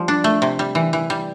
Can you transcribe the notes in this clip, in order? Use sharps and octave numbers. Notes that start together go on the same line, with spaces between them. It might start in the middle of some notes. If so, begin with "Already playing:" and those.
Already playing: F3 G3
D4
A3
C3
G3
E3
E3
G3